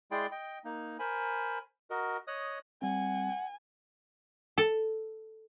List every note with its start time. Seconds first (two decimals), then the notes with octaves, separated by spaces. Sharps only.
0.11 G#3 E4 G#4 D5 G5 C6
0.32 D#5 G5
0.64 A#3 D#4
0.99 A#4 C5 G#5 B5
1.90 F#4 A#4 D#5
2.27 C#5 D#5 D#6 F#6
2.82 G3 C4 F#5 G#5
4.58 A4